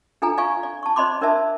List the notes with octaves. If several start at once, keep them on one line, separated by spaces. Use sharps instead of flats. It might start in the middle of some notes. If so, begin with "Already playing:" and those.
D4 G#4 A4 B4 G#5 A#5
D5 F5 G#5 C#6
D5
A5 C#6
C5 D5 D#5 B5 C6 D6
D4 A#4 C5 D5 E5 A5